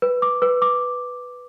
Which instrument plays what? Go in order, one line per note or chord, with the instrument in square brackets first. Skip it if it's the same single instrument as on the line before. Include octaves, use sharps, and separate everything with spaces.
[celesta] B4
D6
B4
D6